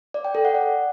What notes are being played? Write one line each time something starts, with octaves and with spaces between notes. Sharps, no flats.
D5
G5
A4
F#5
D5